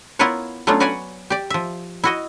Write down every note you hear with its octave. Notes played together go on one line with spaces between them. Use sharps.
B3 E4 F4 A#4 B4 C#5
F#3 A3 B3 C#4 D4 F4
F#4 B4 C#5 D5 F#5 G#5
G4 D5
F3 E5
E4 F#4 D#5